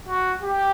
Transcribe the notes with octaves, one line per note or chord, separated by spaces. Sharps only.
F#4
G4